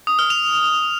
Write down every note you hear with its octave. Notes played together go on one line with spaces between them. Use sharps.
D#6
F6
F7